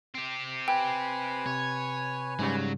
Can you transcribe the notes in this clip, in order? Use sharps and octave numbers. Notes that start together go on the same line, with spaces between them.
C4 G4
B4 G5 G#5
C3 C#5
G#2 C#3 F#3 G3